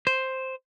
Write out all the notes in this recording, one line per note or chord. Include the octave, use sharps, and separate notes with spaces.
C5